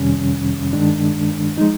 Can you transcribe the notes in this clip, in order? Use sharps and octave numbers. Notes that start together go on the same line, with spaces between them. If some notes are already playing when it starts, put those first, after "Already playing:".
Already playing: F2 C3 D#3 G3 C#4
G2 D#3 G#3 D4
F3 G#3 D#4